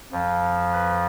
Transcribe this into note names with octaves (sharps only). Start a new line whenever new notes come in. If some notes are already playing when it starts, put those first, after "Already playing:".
F2 F3
B4